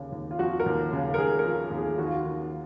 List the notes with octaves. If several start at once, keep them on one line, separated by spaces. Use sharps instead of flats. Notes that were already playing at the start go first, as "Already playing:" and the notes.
Already playing: D#2 C#3
D#2
F4
F3 F#4
A#4
D#2
C#3
A#4
D#2 G#4
A#4
F3
D#2
G#4
D#3 F#4
F4
F#4
D#3